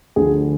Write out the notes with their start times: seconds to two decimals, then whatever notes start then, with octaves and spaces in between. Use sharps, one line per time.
0.16 D2 D3 F3 G#4